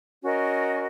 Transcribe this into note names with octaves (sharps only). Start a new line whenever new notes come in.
C#4 F#4 A#4 D#5